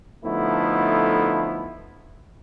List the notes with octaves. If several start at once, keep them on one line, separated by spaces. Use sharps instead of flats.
D3 F3 A3 B3 D#4 E4